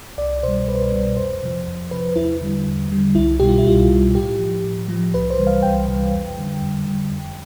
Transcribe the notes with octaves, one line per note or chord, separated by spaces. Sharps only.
C2 D5
B2 G3 C5
C2 B4
C5
B4
B2 G3
F2 C5
C3 F3
F2
C3 F3 B4
E2 E4
D3 G3
E2
D3 G3
C2 E4
B2 G3 G4
F4
E4
C2 F4
B2
G3
A2 G4
F3
A2
F3
C2 B4
C5
C3 E3 G3
F5
C2 G5
C3 E3 G3
F2
D3 G3
F2
D3 G3
F2